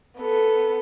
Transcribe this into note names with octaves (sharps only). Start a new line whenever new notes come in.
B3 A4